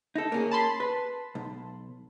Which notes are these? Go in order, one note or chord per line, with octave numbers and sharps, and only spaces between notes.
D#4 A4
A#3 C#4 G#4
A5 B5 C6
B4
B1